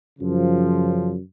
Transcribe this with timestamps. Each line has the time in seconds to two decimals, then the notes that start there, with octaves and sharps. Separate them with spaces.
0.19 F#2 C#3 F3